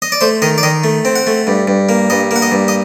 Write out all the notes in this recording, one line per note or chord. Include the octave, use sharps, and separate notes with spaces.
D#5
D5
A3 C5
D#3 D#5
D5
D#3 D#5
A3
C4
F#5
A3
G2
G2
A#3
G2 D#5
A#3 F#5
D#5
G2
D#5